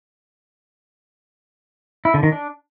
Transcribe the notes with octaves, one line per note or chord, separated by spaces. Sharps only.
E4
D3
D#3
D4